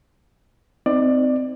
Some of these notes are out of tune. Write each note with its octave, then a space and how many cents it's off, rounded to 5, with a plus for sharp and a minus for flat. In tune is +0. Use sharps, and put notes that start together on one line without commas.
C4 -20 D#4 +10 D5 +20